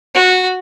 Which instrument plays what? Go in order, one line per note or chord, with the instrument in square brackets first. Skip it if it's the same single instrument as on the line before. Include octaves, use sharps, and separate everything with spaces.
[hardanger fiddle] F#4